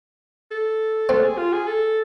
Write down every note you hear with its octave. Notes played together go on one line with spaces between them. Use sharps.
A4
A3 C4 A4
G#4
F4
G#4
A4